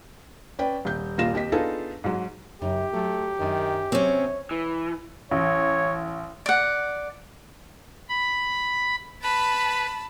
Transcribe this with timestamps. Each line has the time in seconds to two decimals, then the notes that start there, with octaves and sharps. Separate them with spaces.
0.59 C#4 B4 D5 G5
0.85 D#1 G6
1.18 D#1 A#2 F4 A#6 E7
1.34 D#2 G4 D#5 B6
1.52 B3 D4 D#4 F4 G#4 A4
2.04 G#2 F#3
2.62 F#2 C#3 D#4 G4
2.93 F#3 A3
3.39 F#2 D#3 D4 G#5
3.92 C3 F#3 C4 C#4 C#5
4.51 E3
5.31 A1 C#5
6.46 D5 F#5
8.09 B5
9.22 B4 A5 B5